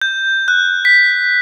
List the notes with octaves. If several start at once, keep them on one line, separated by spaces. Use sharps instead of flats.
G6
F#6
B6